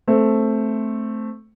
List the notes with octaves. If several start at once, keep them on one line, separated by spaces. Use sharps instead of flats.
A3 C4